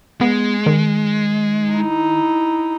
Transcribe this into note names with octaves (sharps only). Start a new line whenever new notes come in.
G#3 B3
D#3
D#4 E4